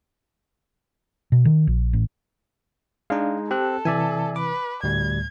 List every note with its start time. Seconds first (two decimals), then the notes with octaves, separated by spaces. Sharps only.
1.32 B2
1.45 D#3
1.67 A#1
1.93 A1
3.10 G#3 D4 D#4 F5
3.51 C4 G4 A4 F#6
3.85 C3 E3 D5 E5 G#5
4.36 B4 D6
4.83 D2 A2 G3 G#6